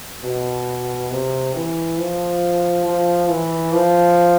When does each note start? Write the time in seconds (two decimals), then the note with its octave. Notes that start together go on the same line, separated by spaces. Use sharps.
0.24 B2
1.10 C3
1.54 E3
1.98 F3
2.85 F3
3.29 E3
3.72 F3